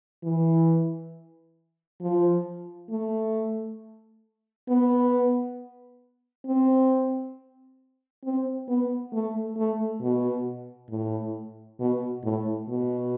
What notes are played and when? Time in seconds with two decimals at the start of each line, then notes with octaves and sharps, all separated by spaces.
0.23 E3
2.01 F3
2.90 A3
4.68 B3
6.46 C4
8.24 C4
8.68 B3
9.12 A3
9.57 A3
10.01 B2
10.90 A2
11.80 B2
12.24 A2
12.68 B2